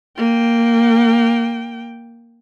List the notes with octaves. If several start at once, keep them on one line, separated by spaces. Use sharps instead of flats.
A#3 G5